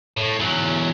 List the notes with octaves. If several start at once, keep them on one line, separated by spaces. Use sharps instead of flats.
A2
E2 F#3